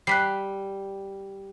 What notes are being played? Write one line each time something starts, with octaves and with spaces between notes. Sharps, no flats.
G3 F#6 B6 C7